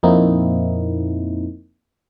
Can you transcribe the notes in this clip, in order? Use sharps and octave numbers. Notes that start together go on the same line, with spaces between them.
F2 A#2 A#3 C4 D#4 E4